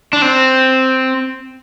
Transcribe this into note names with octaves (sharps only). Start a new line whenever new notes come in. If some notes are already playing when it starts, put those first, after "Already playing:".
D4
C4